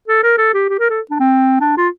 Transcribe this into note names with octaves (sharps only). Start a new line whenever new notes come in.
A4
A#4
A4
G4
G4
A#4
A4
D4
C4
D4
F4